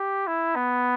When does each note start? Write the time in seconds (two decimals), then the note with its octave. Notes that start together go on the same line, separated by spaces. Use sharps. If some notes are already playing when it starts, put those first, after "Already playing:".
Already playing: G4
0.27 E4
0.56 B3